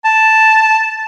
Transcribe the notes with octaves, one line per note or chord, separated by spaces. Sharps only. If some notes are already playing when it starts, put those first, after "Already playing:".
A5